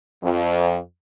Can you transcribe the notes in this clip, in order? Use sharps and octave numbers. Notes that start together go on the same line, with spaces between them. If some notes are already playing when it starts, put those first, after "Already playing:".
F2